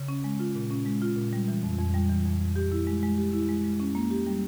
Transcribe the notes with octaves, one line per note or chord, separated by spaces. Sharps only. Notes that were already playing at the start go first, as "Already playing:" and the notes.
Already playing: C#3
C#4
G#3
F4
A#2
C#4
G#3
F4
A#2
G3
E3
F2
F2
G3
E3
F2
F2
G4
E4
G#3
G#3
G4
E4
G#3
G#3
C#4
A#3
G4
G3